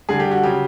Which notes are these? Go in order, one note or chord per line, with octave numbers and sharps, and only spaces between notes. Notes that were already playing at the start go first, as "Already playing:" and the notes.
D3 G3 G#4
G4
F#4
C#3 F#3 G4